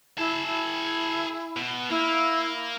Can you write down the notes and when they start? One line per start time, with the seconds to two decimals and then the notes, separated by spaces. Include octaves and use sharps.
0.18 E4 G#4 A5
0.47 E4
1.57 B2
1.90 A#3 E4